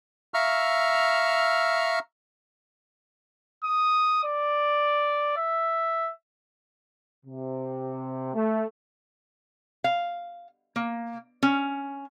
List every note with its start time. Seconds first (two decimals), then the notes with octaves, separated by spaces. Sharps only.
0.34 E5 F5 A#5 C#6 E6 F6
3.64 D#6
4.24 D5
5.37 E5
7.25 C3
8.33 A3
9.84 F5
10.76 A#3
11.43 C#4